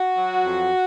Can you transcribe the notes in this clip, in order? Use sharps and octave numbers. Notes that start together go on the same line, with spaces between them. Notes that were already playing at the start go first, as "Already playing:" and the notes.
Already playing: F#4
F#3
F2